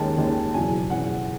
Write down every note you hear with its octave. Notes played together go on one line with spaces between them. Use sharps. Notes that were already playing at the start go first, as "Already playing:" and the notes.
Already playing: D#2 D#3 G#3 C#4 A5
D#2 D#3 G#3 C#4
E1 E2 C#3 F#3 G#5
E1 E2 C#3 F#3 F#5